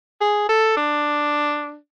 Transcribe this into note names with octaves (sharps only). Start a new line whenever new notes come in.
G#4
A4
D4